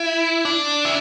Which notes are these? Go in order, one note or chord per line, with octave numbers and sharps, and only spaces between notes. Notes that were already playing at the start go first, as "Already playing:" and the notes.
Already playing: E4
D4
E4